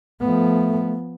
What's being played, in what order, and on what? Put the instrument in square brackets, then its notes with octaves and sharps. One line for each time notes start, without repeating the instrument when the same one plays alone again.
[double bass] F3 B3 [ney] A3